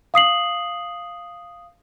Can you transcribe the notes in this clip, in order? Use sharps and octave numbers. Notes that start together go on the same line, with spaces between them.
F5 D#6 C7 F#7